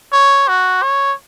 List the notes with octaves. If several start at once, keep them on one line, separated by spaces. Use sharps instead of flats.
C#5
F#4
C#5